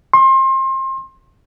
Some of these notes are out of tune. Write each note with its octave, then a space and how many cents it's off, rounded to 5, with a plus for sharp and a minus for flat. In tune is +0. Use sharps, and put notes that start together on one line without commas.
C6 +30